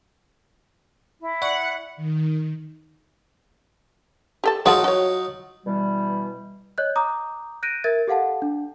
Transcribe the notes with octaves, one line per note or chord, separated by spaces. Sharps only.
E4
D5 F#5 C#6
D#3
G4 A4 A5
F#3 G#3 D#4 F4 F#5 A5
F#4 C#5
B2 E3 G3
C#5 D#5 F#6 G6
A#5 D6 D#6 G6
F#6 G6 A#6 D7 D#7
A#4 E5 G#6 A6
G4 A4 F5 F#5 A5
D4